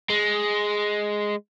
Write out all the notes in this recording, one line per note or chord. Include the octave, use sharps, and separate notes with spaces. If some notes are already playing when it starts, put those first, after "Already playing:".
G#3